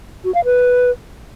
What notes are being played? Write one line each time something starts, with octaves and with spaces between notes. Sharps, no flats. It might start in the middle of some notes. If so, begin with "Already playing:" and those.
F#4
F5
B4